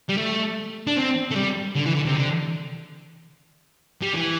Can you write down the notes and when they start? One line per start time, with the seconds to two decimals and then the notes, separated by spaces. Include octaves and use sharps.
0.09 G3
0.17 A3
0.87 D4
0.96 C4
1.31 A3
1.35 G3
1.75 D3
1.86 E3
1.94 D3
2.06 C3
2.15 D3
4.02 G3
4.14 E3